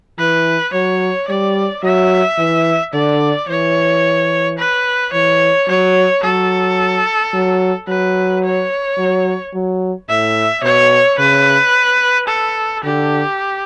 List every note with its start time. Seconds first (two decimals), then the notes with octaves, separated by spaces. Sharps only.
0.19 E3 B4
0.73 F#3 C#5
1.28 G3 D5
1.84 F#3 E5
2.39 E3
2.94 D3 D5
3.49 E3 C#5
4.58 B4
5.13 E3 C#5
5.69 F#3 C#5
6.24 F#3 A4
7.34 F#3
7.88 F#3 B4
8.44 C#5
8.98 F#3
9.54 F#3
10.09 A2 E5
10.63 B2 C#5
11.19 C#3 B4
12.28 A4
12.84 D3 G4